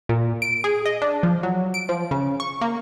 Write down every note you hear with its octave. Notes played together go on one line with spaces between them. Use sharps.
A#2
D7
G#4
D#5
D4
F3
F#3
D7
F3
C#3
C#6
A#3